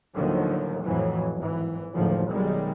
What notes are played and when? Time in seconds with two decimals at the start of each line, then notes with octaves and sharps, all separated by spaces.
0.15 D#2 A2 D3 D#3 F3 F#3
0.84 F2 A2 E3 F#3
1.37 G#1 E3
1.95 F#1 D2 A2 D#3 F3
2.31 B1 D#3 G3 G#3